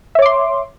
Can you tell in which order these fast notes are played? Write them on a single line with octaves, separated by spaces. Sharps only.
E5 C#5 D6 C6